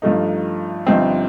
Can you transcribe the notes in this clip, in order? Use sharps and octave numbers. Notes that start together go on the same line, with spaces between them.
G2 F3 A3 D#4
G1 G2 F3 C4 D#4